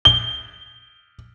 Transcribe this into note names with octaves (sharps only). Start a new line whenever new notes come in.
G7